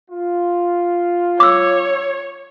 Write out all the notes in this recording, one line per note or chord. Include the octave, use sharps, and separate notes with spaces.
F4
C#5 D6 E6